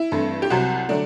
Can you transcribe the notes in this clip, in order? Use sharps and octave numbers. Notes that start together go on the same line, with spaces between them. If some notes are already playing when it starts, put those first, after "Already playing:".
Already playing: E4
G2 E3 A3 C4
G4
C2 C3 F#3 F#4
D3 F#3 A3 D4